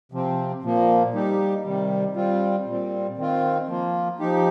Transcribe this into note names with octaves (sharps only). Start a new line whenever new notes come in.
C3 F3 C4
A#2 F3 A#3
G3 D#4 G4
C3 D#3 G3
G3 C4 F4
A#2 G3 C4
D#3 C4 F4
F3 A#3 F4
F3 D#4 G4